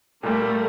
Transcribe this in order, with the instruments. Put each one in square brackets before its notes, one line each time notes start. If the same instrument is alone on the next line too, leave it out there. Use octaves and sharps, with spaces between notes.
[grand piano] A#2 G3 A#3 [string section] A3